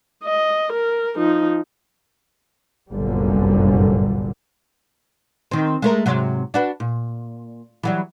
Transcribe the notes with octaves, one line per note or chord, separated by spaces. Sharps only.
D#5
A#4
F3 D#4
G1 C2 F#2 A#2 D3 G3
D#3 C4
G#3 A3 A#4
G#2 C3 F#3
D4 F#4 B4
A#2
E3 F#3 G3